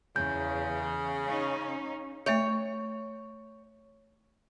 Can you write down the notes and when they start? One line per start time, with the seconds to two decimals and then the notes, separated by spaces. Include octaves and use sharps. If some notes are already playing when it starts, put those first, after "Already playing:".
0.16 E2 C#3 G6
1.25 C#4 D#4
2.26 A3 C#5 E5 G6